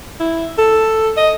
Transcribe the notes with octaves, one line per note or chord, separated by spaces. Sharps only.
E4
A4
D#5